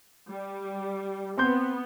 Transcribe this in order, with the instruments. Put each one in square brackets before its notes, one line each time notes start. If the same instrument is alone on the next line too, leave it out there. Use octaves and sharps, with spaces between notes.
[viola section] G3
[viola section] B3 [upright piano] C4 C6 G6